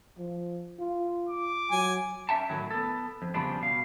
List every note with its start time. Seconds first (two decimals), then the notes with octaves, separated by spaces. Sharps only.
0.18 F3
0.80 F4
1.29 D6
1.71 F#3 G#5
2.29 C#4 E5 G5 A5
2.49 A2 D#3 F#3
2.71 B3 A4
3.22 F2
3.34 C#3 F3 G3 B3 D4
3.61 B2 F5